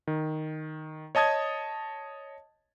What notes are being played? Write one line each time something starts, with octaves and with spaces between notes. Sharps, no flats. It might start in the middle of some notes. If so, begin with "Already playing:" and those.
D#3
C#5 D#5 A5 D#6 G#6